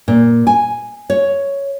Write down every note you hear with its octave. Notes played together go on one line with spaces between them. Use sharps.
A#2
G#5
C#5